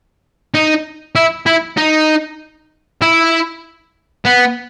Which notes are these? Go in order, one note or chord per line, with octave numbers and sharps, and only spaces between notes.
D#4
E4
E4
D#4
E4
B3